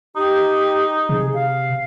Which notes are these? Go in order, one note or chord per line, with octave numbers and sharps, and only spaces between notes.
D#4 G4
C3 G#4
F5